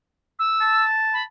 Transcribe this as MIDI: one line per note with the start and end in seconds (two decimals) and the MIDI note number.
0.39 0.84 88
0.61 1.21 81
1.13 1.23 83